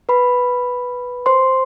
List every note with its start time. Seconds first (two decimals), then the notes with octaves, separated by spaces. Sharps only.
0.09 B4 B5
1.26 C5 C6